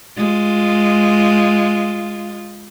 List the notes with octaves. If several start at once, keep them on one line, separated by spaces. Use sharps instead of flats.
G#3 F4